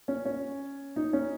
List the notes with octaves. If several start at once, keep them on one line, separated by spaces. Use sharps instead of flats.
C#4
C#4
D#4
C#4